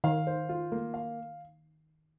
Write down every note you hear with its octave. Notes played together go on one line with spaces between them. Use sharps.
D#3 F5
C5
F4
A#3
F5